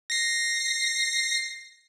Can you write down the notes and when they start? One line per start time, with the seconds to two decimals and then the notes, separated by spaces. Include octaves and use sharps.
0.10 A#6 C7